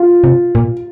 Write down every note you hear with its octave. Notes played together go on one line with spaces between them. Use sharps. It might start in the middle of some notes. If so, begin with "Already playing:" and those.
Already playing: F4
C3
A#2